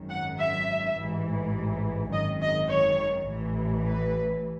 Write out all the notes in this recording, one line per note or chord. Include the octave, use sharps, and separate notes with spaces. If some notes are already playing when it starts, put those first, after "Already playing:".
Already playing: G#1 F#2 D#3
F#5
E5
A1 G#2 E3
G#1 F#2 D#3 D#5
D#5
C#5
A1 A2 E3
B4